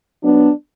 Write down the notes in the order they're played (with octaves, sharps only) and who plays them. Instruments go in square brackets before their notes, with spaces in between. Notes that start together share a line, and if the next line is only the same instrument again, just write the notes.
[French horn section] F#3 B3 D4